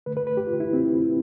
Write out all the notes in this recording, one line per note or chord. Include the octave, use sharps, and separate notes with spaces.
D3 A3 B4
B4
B4
G4
F4
E4
C4